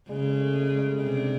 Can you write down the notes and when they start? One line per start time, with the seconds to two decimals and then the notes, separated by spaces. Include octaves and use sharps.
0.09 C#3 G#3
0.24 A3
0.40 A3
0.55 G#3
0.67 A3
0.78 G#3
0.89 G3
1.00 C3 G#3
1.16 D4